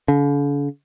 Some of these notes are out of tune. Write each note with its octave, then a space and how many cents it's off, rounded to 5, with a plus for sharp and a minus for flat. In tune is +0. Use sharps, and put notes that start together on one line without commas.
D3 -45